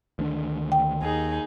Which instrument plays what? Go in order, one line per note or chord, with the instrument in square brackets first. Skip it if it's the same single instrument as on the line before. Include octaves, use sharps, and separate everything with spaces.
[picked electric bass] D2 D#3 D4
[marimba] G5
[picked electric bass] D#2 [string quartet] D#4 G#4